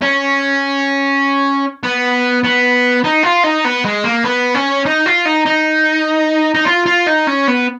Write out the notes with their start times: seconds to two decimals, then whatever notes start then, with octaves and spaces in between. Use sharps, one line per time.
0.02 C#4
1.84 B3
2.44 B3
3.04 D#4
3.24 F4
3.44 D#4
3.65 B3
3.85 G#3
4.04 A#3
4.25 B3
4.55 C#4
4.86 D#4
5.06 F4
5.26 D#4
5.46 D#4
6.55 D#4
6.67 F4
6.86 F4
7.07 D#4
7.27 C#4
7.48 B3